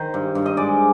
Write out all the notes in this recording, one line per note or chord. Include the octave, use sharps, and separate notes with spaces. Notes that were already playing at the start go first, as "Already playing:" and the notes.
Already playing: D#3 C5
G2
G2
D#5
G#3 D5